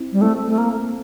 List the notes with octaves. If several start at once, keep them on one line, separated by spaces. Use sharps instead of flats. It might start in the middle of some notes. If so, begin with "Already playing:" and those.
Already playing: C4 E4
G3
A3 C4 E4
A3
A#3